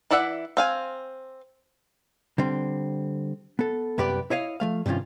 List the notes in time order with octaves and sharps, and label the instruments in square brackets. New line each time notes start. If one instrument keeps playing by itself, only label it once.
[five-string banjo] E3 E4 D5 E5 F#5
C4 F5 G#5
[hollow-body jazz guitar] D3 G3 C4
B3 A4
C2 F#2 B3 G4 B4 D5
E4 C#5 D#5 F5
F3 A3 F5
G2 C3 D#3 C#4 F4